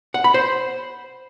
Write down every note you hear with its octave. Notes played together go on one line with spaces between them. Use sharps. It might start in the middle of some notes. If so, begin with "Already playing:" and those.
F#5
B5
C5